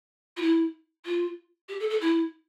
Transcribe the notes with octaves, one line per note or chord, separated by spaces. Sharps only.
F4
E4
F4
G4
A4
A4
E4